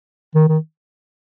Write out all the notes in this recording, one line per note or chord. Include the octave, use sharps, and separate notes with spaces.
D#3
D#3